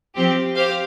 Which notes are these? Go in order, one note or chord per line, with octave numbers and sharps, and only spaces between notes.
F3 C4 G4
G4 C5 F5